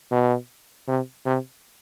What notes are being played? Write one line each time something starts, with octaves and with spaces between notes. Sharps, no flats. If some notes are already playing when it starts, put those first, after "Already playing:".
B2
C3
C3